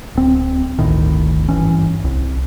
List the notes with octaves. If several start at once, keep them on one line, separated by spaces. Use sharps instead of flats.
D1 C4
G1 D2 A2 D#3
G#1 G2 E3 C#4
C2